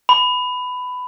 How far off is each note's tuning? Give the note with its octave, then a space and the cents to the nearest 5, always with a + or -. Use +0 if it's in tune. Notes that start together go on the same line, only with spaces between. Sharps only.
B5 +15